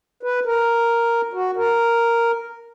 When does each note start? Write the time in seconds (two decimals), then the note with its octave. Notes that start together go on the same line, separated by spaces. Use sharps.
0.23 B4
0.45 A#4
1.33 F#4
1.56 A#4